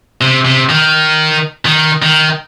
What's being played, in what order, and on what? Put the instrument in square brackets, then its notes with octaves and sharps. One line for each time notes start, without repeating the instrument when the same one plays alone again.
[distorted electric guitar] C3
C3
D#3
D#3
D#3